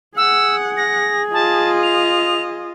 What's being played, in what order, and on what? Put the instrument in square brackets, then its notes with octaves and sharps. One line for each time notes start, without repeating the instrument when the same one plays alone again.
[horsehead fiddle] G#4 [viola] F#5 [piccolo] E6
[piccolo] A#6
[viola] F4 D#5 [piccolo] A5
[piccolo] F7